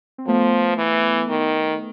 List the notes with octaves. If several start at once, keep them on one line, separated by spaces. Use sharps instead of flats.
C4
F3 A3 B3
E3
D#3